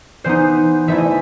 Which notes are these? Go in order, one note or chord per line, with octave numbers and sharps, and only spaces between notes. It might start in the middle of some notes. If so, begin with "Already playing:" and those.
E3 B3 D#4 C5
E3 A3 E4 E5
D#5